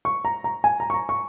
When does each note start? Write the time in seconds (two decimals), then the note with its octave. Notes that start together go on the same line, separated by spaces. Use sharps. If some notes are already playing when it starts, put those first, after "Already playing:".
0.05 C#6
0.25 A#5
0.44 A#5
0.64 G#5
0.80 A#5
0.90 C#6
0.94 A#5
1.09 C#6